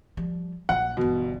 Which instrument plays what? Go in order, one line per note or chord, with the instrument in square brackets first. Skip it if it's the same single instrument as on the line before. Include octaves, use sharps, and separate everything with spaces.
[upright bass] F3 G3
[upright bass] A#1 F#3 [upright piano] F#5
[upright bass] G1 E3 [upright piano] B2